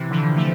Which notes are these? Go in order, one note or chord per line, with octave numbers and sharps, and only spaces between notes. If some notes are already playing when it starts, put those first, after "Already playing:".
Already playing: C3 E3
D3 F3
F3 A3